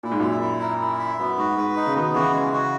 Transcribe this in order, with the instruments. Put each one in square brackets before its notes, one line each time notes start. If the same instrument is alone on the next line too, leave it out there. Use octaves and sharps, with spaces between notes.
[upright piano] A#2 [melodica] E4
[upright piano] G#2
[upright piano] F#2 A#2 [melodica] E5
[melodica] E4
A#4
E4
E5
[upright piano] F#2 [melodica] B3
[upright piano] G#2 [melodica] F#4
[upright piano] G#2 [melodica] B4
[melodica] D#4
[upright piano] C#3
[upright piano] B2 D#3 [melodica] B3
[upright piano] C#3 E3 [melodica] F#4
[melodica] G#3
F#4